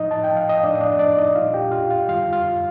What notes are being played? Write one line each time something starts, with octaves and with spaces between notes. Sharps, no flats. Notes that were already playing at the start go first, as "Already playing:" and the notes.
Already playing: A2 F3 D#4 D#5
A5
G5
F5
D#5
A2 F3 D4 D5
D#5
D4 D5
D4 D5
D#4 D#5
A#2 G3 F4 F5
G4 G5
F4 F5
F4 F5
F2 D3 G3 F4 F5
F4 F5